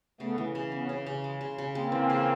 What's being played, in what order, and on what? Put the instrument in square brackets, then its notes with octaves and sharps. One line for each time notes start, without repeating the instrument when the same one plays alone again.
[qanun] C#3 [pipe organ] A3 B3
[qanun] E3
C#3
[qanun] E3 [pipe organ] B3 C#4
[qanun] C#3
C#3
G#3
C#3
C#3
[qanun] G#3 [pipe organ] A#3 C4
[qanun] E3
C#3